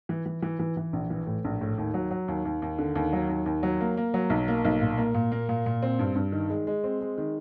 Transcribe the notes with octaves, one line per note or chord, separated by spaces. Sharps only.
E3
E3
E3
E3
E3
A#1
E3
A2
A#1
A2
D#2
F#3
F#3
D#2
D#2
D#2
D3
D#2
F#3
D#2
D#2
F#3
A#3
A#3
F#3
B1
A#3
B1
A#2
A#3
A#2
A#3
A#2
A#2
C4
G2
G2
D#3
G#3
G#3
C4
G#3
D#3